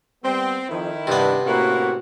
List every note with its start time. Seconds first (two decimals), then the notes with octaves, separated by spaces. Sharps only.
0.24 G3 B3 C4
0.69 F2 D#3 E4 C5
1.07 G2 C3 B3 D4
1.46 A2 A#3 C4 C#4 E4 F#4